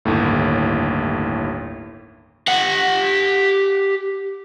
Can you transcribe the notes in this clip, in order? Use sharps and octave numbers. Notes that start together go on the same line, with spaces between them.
G1 D#2 A2
G4 F#5